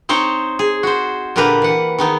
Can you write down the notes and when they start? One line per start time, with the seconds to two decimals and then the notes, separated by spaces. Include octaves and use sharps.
0.09 C4 D#4 C5 C#5 G5
0.59 G#4
0.83 F#4 C5
1.36 A#2 D3 A#3 G4 B4 A#5
1.62 E3 F#5
1.99 D#3 B3 D#4